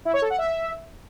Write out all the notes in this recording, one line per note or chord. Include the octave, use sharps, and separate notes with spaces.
E4
C#5
A4
F#5
E5